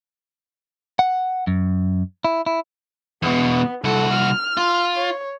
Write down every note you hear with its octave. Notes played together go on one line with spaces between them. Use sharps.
F#5
F#2
E4
E4
E2 B2 B3
C2 F#4 A4
F6
F4
C#5